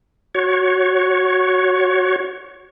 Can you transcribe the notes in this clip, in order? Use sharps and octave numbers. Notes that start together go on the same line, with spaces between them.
F#4 C#5